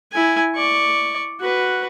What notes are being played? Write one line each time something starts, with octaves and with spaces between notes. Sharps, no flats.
E4 G#5
D5 C#6
F#4 B4